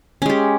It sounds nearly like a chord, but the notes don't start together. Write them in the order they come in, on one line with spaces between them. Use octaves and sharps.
C#4 G#3 G4